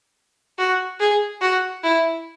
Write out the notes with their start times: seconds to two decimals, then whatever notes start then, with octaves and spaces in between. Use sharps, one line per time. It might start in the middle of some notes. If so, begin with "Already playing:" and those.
0.59 F#4
1.00 G#4
1.42 F#4
1.84 E4